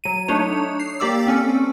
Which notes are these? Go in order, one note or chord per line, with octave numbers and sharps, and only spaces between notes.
F#3 D#7
A3 D4 D#4 C#5
C7
A#3 G4 D5 D6 E6
C4 C#4 A4